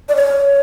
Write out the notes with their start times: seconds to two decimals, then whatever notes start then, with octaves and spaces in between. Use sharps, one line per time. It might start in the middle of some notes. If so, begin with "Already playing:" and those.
0.09 D5
0.16 C#5